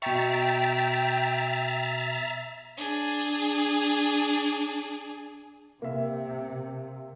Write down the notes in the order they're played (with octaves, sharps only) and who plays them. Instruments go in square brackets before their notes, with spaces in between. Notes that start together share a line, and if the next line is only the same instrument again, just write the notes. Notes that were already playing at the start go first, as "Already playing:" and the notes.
[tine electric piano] B2 C#6 [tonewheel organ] E5 A#5 A6 [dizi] G5
[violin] D4 G#4
[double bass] C3 [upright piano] A#3 E5